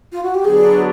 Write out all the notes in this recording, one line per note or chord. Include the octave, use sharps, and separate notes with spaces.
F4
F#4
G4
D3 F#3 B3 D4 G#4